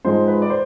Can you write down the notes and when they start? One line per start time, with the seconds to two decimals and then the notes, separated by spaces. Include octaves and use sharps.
0.05 G#2 F3 G#3 C5
0.27 B4
0.42 D5
0.50 C5